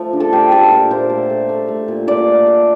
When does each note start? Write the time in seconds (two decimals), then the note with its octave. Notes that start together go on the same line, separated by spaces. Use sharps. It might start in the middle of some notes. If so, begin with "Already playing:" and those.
Already playing: F3 A3
0.13 D3
0.20 A4
0.32 A3 G4
0.52 A3 A4
0.71 A#2 A#4
0.91 A#2 C5
1.10 A3
1.30 A3
1.49 A3
1.68 A3
1.88 A#2
2.07 A#2 D5
2.27 A3
2.47 A3